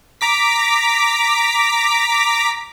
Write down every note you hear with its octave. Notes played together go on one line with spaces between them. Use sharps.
A#5 D6 B6